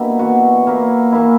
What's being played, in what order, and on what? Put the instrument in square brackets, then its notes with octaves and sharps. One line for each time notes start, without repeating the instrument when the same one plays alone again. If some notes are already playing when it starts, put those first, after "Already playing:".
Already playing: [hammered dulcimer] B2 G3 A#3 D4 E4
E3 B3 F#4
A#2 A#3 E4
E3 A#3 E4